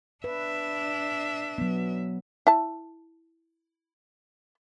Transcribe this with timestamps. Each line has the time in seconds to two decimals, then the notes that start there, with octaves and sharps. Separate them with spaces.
0.24 D4 B4 E5
1.58 F#3 B3
2.47 E4 A5